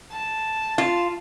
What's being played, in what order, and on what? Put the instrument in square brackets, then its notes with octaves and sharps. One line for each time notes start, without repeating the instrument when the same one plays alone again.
[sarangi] A5
[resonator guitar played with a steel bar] F4